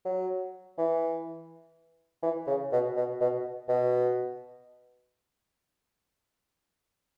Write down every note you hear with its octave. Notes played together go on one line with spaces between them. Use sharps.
F#3
E3
E3
C#3
B2
B2
B2
B2